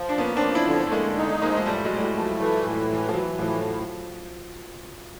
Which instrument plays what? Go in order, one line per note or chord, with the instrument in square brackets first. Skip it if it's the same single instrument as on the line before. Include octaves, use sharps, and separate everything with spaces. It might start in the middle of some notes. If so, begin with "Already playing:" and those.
Already playing: [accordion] F3
[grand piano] D4
[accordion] A#3 [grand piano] B3 C#4
[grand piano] C4 D4
[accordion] F3
[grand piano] D4 E4
[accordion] D3
[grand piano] A3
[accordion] D3 [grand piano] G#3 A#3
[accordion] D#4
[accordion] F3 [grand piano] G#3 A#3
[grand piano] G#3
[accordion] A2 [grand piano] G3 A3
[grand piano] F#3 G#3
[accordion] A2 [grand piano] G3
[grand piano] F#3
[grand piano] F3 [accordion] A3
[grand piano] F#3
[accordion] E3
A2
E3
[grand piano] F3
[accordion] E3 [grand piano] F#3
[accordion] A2 [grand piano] F3